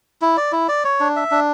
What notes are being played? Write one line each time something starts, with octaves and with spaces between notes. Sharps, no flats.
E4
D5
E4
D5
C#5
D4
E5
D4